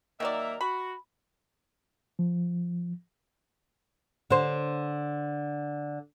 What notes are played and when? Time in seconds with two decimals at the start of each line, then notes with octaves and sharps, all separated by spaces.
0.20 D#3 F#3 A#3 A#4 D5 E5
0.61 F#4 B5
2.19 F3
4.31 D3 C5